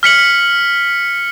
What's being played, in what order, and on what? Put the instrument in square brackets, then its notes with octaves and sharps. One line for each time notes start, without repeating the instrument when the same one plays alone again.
[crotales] F6 B6 C#7 F#7